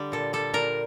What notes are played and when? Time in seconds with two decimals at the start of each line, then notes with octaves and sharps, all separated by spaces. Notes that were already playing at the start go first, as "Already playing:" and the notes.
Already playing: D3 G3
0.12 A#2 A4
0.33 G3 A4
0.54 A#2 A#4